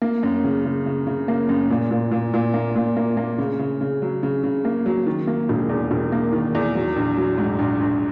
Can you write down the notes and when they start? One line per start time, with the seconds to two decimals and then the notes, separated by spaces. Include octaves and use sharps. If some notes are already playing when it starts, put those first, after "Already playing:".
0.02 A#3
0.23 F#2
0.44 C#3
0.65 C#3
0.86 C#3
1.07 C#3
1.28 A#3
1.49 F#2
1.70 A#2
1.91 A#2
2.11 A#2
2.33 A#2
2.54 A#3
2.75 A#2
2.97 A#3
3.17 A#3
3.38 C#3
3.59 C#3
3.81 C#3
4.02 F#3
4.23 C#3
4.43 C#3
4.65 A#3
4.86 F#3
5.06 D#3
5.27 A#3
5.49 E1
5.69 E2
5.91 E1
6.12 A#3
6.32 D#3
6.55 E2
6.75 F#3
6.96 A#1
7.17 F#3
7.38 G#2
7.59 A#1
7.81 A#1